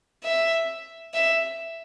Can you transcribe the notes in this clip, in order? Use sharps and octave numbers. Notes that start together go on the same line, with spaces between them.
E5
E5